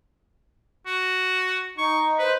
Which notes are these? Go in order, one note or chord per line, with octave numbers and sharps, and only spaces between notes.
F#4
D#4 C#6
B4 C5